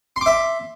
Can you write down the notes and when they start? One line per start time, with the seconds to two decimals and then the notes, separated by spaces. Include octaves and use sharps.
0.16 C6
0.21 D6
0.26 E5